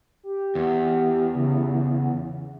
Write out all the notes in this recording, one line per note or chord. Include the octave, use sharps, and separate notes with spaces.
G4
E2
C#3